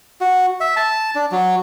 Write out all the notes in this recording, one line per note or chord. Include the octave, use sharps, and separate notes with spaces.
F#4
E5
A5
D4
F#3